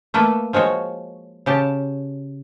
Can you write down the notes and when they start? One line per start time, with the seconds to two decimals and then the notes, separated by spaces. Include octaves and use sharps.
0.14 A3 A#3 A4 B4
0.53 F3 G#3 F#4 C#5
1.46 C#3 G4 A5